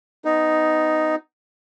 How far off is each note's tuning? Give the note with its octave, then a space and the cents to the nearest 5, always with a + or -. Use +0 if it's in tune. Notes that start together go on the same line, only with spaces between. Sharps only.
B3 +25 D#4 +0